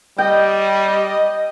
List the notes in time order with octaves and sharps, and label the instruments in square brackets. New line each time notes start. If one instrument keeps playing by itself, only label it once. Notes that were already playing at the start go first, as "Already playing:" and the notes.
[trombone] G3 [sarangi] D#5 [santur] G5